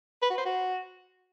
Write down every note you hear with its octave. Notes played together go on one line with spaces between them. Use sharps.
B4
F#4
C5
F#4